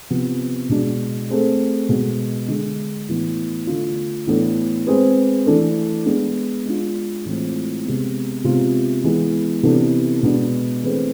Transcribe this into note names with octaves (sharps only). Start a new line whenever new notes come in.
C3 F3 B3
B2 G#3 D4
A3 C4 G#4
B2 G#3 B3
D3 G#3 D4
A2 E3 B3
D3 A3 D4 F4
A2 E3 B3 D4 A4
G#3 C4 G#4 B4
E3 A3 D4 A4
G#3 B3 D4 G#4
G#3 D4 F4
A2 E3 G#3 C4 F4
C3 G#3 B3
C3 G#3 B3 F4
E3 G#3 B3
C3 E3 B3 D4 A4
B2 G#3 B3 D4
E3 A3 C4 G#4 B4